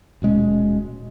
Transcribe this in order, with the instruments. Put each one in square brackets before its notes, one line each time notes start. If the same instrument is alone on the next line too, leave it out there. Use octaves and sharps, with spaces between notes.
[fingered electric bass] D#1 B2 G#3 C#4